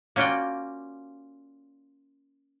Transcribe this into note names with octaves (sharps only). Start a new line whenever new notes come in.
A#3 C#4 F4 F#4 D5 G5